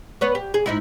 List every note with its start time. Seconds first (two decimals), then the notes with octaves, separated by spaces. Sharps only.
0.21 B3 B4 C#5
0.35 G4
0.54 G#4
0.66 G#2 D#4 E4